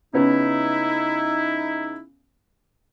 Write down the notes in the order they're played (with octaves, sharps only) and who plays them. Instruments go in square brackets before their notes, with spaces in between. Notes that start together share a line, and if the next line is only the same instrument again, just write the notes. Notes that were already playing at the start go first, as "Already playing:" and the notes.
[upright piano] C#3 B3 C#4 [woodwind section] D#4 E4